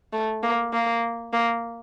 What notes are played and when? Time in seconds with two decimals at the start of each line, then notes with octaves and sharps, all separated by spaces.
0.13 A3
0.43 A#3
0.73 A#3
1.33 A#3